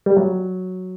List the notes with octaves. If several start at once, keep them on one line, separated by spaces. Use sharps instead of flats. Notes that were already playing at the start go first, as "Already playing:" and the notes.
G3
F#3